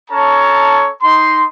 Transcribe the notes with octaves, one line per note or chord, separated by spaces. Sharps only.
C#4 A4 C#5 A5 A#5
D#4 C6